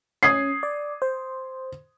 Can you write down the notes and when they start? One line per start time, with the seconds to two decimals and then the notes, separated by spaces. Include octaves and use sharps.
0.23 C#4 D#6 G#6 C7
0.63 D5
1.02 C5